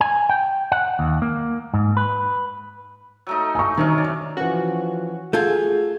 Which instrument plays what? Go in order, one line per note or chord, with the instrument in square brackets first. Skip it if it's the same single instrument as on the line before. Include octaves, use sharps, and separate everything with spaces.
[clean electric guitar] G#5
G5
F#5
D#2
A#3
G#2
B4
[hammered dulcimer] F#3 A3 D#4
[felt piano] G#5 C#6
[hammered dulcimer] C3 F#3 C#4 [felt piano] D#3
[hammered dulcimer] D5
[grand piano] E3 C#4 [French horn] F3 [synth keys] F#4
[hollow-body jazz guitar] A3 F4 A4 [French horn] G#4 [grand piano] G6 G#6